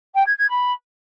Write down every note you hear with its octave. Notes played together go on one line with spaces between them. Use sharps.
G5
G#6
G#6
B5